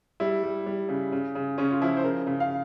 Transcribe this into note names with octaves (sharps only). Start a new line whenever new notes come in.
G3 E4
G3
G3
C#3
C#3
C#3
C#3 C#4
F4
F3 E4
C5
C#3 A#4
C#3
F5